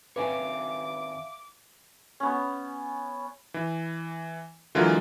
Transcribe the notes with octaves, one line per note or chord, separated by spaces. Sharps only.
D#3 C4 B4 C#5 E5 F5 G#5 D6
B3 C#4
E3
D3 E3 F#3 G#3 F4 A#4